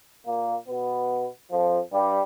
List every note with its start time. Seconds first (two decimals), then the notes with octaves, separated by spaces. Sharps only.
0.27 A#2 A#3
0.69 B2 B3
1.51 F2 F3
1.92 G2 G3